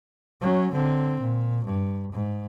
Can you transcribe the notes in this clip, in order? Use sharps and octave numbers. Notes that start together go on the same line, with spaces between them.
F#3 C#4
D3 C4
A#2
G2
G#2